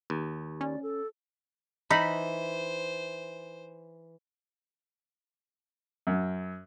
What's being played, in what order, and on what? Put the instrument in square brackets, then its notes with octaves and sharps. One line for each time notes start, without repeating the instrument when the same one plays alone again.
[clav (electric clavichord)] D#2
[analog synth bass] C#4 [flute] D5
[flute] A4
[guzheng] E3 [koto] D#4 [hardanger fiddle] C5 [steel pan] B5
[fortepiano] F#2